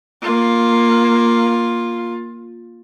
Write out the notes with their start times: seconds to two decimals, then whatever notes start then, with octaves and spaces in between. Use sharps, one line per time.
0.22 A#3 F4